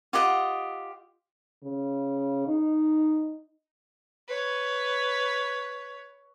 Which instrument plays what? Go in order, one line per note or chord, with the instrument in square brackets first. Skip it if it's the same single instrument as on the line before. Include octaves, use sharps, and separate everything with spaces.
[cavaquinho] F4 G4 D#5 F#5
[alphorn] C#3
D#4
[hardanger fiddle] B4 C#5